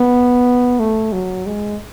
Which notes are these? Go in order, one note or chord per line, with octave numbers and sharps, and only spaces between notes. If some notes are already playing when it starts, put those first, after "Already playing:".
Already playing: B3
A3
F#3
G#3